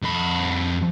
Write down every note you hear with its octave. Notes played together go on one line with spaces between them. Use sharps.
F2 B5